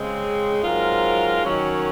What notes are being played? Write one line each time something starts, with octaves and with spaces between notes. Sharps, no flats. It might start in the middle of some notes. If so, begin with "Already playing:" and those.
Already playing: C#3 G#3 C4
G#2 F#3 C4 F4 A#4
D#3 F#3 C#4